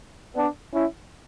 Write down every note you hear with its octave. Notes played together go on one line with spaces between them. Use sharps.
B3 D4
C#4 E4